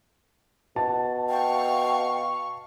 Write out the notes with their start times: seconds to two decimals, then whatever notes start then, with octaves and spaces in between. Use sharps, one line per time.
0.76 B2 A5
1.29 F5 G5 C#6